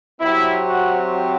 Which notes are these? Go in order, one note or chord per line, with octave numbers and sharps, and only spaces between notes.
C3 F#3 C4 E4
F#4